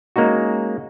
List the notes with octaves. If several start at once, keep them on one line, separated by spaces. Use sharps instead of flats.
G#3 A#3 C#4 D#4 F#4